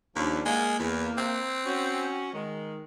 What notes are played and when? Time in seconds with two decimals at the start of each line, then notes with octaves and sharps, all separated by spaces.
0.16 D#2 F3 C#4 D4
0.46 G#3 A#3
0.79 E2
1.18 C4
1.65 C#4 F#4
2.34 D#3 G#3